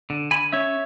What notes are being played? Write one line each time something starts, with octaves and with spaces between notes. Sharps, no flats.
D3
D3 G#5 B5
C#4 C#5 E5